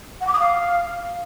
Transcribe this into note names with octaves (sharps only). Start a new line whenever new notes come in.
F#5
D6
D#6
F5